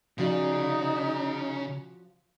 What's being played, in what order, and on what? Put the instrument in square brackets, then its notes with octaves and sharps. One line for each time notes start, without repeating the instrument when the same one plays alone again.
[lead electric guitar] C#3 [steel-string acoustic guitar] F3 F#4 D5 [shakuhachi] D#4